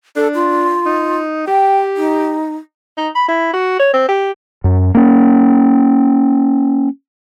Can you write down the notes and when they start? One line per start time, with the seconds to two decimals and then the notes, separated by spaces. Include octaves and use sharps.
0.16 D4 A4
0.34 F4
0.86 D#4
1.47 G4 G5
1.97 D#4
2.97 D#4
3.15 B5
3.28 E4
3.53 F#4
3.80 C#5
3.94 C4
4.08 G4
4.64 F#2
4.95 A#3 C#4